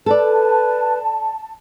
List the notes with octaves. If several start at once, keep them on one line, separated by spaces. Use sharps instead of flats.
A4 B4 D5 A5